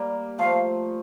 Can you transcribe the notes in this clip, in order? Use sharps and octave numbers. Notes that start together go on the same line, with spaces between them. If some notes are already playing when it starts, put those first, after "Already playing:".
Already playing: G3 A#3
F3 A3 F5